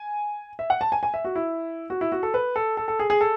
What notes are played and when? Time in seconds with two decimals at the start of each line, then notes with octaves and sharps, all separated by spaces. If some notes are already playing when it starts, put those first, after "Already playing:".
Already playing: G#5
0.59 E5
0.70 F#5
0.81 A5
0.92 G#5
1.03 G#5
1.14 E5
1.25 F#4
1.36 E4
1.90 F#4
2.01 E4
2.12 F#4
2.23 A4
2.34 B4
2.56 A4
2.77 A4
2.88 A4
2.99 G#4
3.10 G#4
3.21 A4